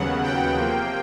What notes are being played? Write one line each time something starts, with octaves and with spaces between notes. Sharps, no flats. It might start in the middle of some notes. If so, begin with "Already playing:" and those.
Already playing: D#2 C#3 F#3 B3 F#5
G5
C3 F3 A#3